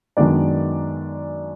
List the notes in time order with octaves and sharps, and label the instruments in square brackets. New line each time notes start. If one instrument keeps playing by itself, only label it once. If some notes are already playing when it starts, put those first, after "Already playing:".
[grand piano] F#2 D#3 G#3 B3 D4 D5